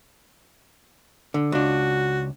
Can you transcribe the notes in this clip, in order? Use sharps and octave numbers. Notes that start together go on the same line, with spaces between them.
D3
C#2 D4 F#4